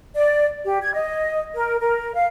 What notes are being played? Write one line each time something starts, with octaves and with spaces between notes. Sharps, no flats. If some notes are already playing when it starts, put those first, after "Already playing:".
D5
G4
G#6
D#5
A#4
A#4
F5